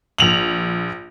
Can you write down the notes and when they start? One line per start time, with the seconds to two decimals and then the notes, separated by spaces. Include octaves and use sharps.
0.18 A#1 F7 F#7